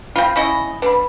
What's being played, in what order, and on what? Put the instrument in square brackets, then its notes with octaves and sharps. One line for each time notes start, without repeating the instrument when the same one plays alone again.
[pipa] C4 F4 [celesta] F5 B5
[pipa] C#4 E4 D#5
[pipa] D3 [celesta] B4 B5